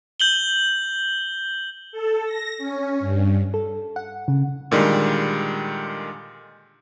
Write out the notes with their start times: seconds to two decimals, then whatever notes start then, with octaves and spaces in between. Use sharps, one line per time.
0.20 G6 F#7 G7
1.92 A4
2.25 A#6
2.58 C#4
3.00 G2
3.54 A4
3.96 F#5
4.28 C#3
4.71 A#2 D3 D#3 G3 G#3